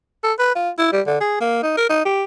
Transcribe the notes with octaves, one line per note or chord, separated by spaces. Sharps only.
A4
B4
F4
E4
G3
D3
G#4
A#3
D#4
A#4
D#4
G4